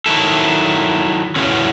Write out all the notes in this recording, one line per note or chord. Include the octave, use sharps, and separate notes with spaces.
D#3 F#3 E4 A4
E2 A2 C#3 F#3 C#4